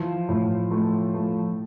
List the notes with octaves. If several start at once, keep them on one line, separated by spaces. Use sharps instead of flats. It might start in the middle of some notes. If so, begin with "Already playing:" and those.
Already playing: E3 F3
A2
A3
A3